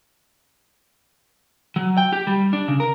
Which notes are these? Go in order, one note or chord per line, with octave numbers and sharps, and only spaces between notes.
F#3
G5
G4
G3
D4
C#3
A#4